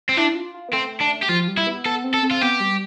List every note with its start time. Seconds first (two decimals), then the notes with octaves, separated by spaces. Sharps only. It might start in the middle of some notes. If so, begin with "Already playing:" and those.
0.09 C4
0.17 D4 E4
0.35 F4
0.54 F4
0.69 B3
0.73 A3 C4
1.01 D4
1.23 G4
1.29 F3 F4
1.48 G3
1.58 E4
1.67 B3
1.85 B3 A4
2.04 C4
2.14 A4
2.23 C4
2.31 F4
2.41 B3 G4
2.60 G3